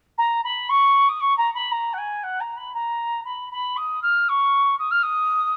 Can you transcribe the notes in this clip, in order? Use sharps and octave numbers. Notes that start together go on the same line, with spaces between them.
A#5
B5
C#6
D#6
C#6
A#5
B5
A#5
F#5
G#5
F#5
A#5
B5
A#5
B5
B5
D#6
F6
C#6
D#6
F6
D#6